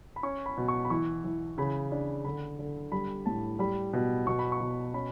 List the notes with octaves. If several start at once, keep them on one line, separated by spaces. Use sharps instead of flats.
B5
C#4 C#6
B5
B2
C#6
B5
E3 C#6
E3
C#3 B5
D4
D3 B5
D3
G3 B5
A2 A5
G3 B5
B2
B2 C#6
B5
C#6
B2
C#4 B5